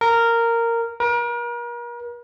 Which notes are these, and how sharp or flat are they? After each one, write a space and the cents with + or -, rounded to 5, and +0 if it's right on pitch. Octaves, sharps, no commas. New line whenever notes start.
A#4 -10
A#4 +40